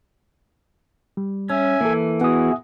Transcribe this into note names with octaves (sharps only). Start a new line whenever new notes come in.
G3
C#4 E5 G#5
E3 A#3 A4
B3 E4 F#4 G#4 F#5 D#6